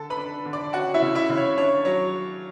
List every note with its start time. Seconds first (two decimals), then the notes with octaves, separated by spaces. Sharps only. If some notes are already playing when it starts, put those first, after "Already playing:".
Already playing: D3 A4 A5
0.10 B4 B5
0.17 D4
0.45 D3
0.53 D5 D6
0.73 C#4 F#4 F#5
0.94 E4 E5
1.02 C#3
1.15 E4 E5
1.29 C#3
1.37 C#5
1.58 D4 C#5
1.85 F#3 C#5